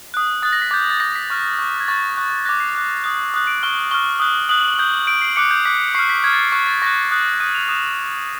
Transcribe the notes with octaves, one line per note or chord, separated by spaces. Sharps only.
D#6 F#6
D#6 F#6 A6
A#6
B6
D6 G6 A6
A6
D6 G6 A#6
B6
C#6 F6
C#6 F6
G#6
C#6 F#6 A6
C#6 F#6
D6 F#6 A#6
C7
D6 F#6
D#6 F#6
D#6 F#6
D7
C#6 F6 G7
C#6 F6 G7
D#6 F#6
D#6 F#6 F#7
D#6 G6
D#6 G6 D7
C7
D6 F#6 C#7
G6
D6 F#6 B6
C#6 F6 C7
B6
C#6 F6 G#6
A6
C#6 F#6
A6
C#6 F#6 A#6
D#6 F#6
D#6 F#6 D#7
F7
D#6 F#6 E7